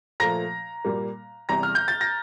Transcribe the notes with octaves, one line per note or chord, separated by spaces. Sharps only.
A#2 F3 A3 A#5 A#6
A#2 G3 A#3
E2 C3 G3 A#5 A#6
F6
G6
A6
A#6